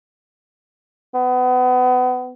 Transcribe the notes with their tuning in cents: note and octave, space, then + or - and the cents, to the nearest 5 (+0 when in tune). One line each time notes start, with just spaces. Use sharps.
B3 +30